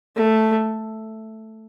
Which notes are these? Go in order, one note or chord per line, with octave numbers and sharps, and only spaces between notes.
A3